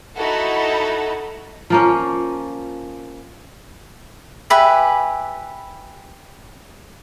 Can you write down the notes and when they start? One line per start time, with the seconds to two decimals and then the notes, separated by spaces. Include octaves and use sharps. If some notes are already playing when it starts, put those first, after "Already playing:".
0.16 D#4 E4 F#4 A4
1.70 F3 A#3 C#4
4.50 G4 B4 E5 G#5